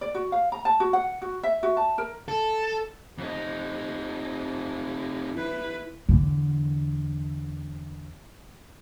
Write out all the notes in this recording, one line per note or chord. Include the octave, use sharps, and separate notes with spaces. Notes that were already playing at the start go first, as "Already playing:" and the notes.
D5
F#4
F5
A#5
A5
F#4
F#5
F#4
E5
F#4
A5
A#4
A4
F2 D#4
E4 B4
E2 D3